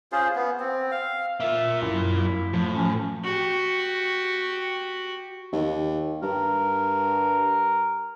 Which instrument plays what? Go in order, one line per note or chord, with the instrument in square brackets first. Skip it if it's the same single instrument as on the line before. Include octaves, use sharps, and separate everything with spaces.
[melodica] C#4 F4 G#4 C5
B3
C4
F5
[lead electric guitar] A#3 F4 [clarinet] E5
[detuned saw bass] F#2 [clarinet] E4
[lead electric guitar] A2 [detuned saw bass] F3
[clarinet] C#4
[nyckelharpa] F#4 G4
[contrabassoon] D#2
[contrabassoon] G2 [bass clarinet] A#4